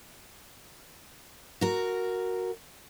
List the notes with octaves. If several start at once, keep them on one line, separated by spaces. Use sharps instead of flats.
F#4 A#4